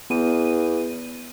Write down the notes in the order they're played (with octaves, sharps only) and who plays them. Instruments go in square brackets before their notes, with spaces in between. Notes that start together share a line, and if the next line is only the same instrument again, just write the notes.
[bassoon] E2 [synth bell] B3 D#7